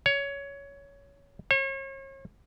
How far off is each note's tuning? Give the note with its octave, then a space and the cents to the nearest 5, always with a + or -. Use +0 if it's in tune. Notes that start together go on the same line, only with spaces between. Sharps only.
C#5 +15
C#5 -40